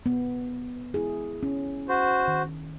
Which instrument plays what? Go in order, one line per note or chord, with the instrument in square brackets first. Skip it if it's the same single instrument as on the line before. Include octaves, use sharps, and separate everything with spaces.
[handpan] B3
E4 G#4
C#4
[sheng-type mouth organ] F#4 C5
[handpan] D#3